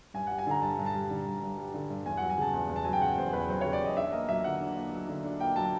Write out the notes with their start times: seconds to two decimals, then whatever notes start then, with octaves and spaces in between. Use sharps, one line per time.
0.14 G2 G#5
0.27 G3 F#5
0.38 G#5
0.47 D3 A#5
0.62 G2 A5
0.78 G2
0.86 A5
0.95 G3
1.10 D3
1.26 G2
1.42 G2
1.58 G3
1.74 D3
1.90 G2
2.06 E2 G#5
2.17 F#3 F#5
2.30 G#5
2.38 C#3 A5
2.53 E2
2.69 E2
2.76 A5
2.84 F#3 G#5
2.93 G5
3.02 C#3 F#5
3.17 E2 C5
3.33 E2 B4
3.49 F#3 C5
3.61 C#3 C#5
3.73 D5
3.81 E2 D#5
3.97 D4 E5
4.12 A#3 D#5
4.29 F#3 E5
4.44 D3 F#5
4.61 D4
4.76 A#3
4.92 F#3
5.09 D3
5.24 D4
5.40 A#3 G5
5.56 F#3 A5